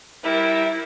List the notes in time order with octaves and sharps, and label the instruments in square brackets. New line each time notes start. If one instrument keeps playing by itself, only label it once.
[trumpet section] G3 A#4 E5 [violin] E4